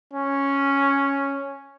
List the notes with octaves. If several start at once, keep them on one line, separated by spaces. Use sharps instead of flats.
C#4